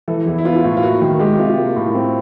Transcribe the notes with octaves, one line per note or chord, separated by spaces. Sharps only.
E3 A4
E2 E4
E4
B3 F4
A2
F4
A#3 F#4
D#3
G#3 G4
C3 F4
A#3
A2
C4